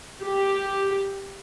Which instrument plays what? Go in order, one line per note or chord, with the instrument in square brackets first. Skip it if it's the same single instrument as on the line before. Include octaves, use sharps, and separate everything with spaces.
[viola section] G4